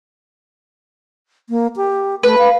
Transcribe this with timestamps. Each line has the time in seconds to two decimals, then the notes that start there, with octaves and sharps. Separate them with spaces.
1.49 A#3
1.76 G4
2.23 A3 B4
2.38 F5